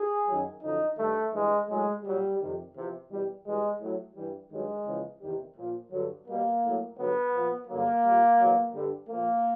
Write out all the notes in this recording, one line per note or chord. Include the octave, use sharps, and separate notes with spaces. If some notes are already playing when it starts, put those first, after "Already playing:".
Already playing: G#4
F#2 D#3 F#3
F#2 D3 F3 D#4
G2 D#3 G3 A3
G2 E3 G3 G#3
A2 F#3 G#3
A#2 F#3 G3
F2 C3 D#3 G3
E2 C3 F3
E2 B2 G3
E2 B2 G3 G#3
A2 F#3
G2 E3 G3
G2 D#3 F#3 G#3
E2 C#3 F3
E2 C3 D#3 G3
A#2 F3
G2 D3 F#3
B2 G3 A#3
A2 F#3
G2 D3 F#3 B3
A#2 F3
G2 D3 F#3 A#3
A#2 G3
E2 B2 F#3
G2 D3 G3
A#2 F3 A#3